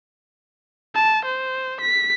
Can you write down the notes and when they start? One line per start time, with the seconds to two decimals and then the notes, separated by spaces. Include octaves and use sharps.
0.94 A5
1.25 C5
1.81 B6